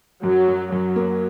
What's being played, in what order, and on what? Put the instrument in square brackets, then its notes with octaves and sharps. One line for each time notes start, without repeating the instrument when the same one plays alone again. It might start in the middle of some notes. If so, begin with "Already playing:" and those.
[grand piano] F#2 [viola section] F#3
[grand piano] F#2
[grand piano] F#2 [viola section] F#3
[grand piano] A#3